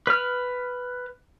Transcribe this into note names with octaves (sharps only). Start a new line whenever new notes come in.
B4 F6